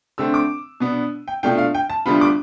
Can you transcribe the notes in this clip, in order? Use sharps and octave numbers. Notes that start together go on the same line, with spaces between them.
D3 A3 C4 E6
D6
B2 B3 D4
G5
B2 A3 D4 F4 G5
F5
G5
A5
D2 D3 G3 B3 F4 B5
D6